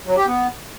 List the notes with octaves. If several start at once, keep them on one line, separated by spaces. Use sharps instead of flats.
F#3
G4
B3